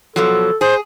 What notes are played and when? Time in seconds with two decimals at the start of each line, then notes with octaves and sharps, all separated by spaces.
0.16 B2 F3 F#3 A4
0.61 G#4 C5